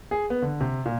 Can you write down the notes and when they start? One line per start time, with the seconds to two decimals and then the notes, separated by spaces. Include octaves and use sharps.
0.11 G#4
0.30 B3
0.42 D3
0.61 C3
0.86 A#2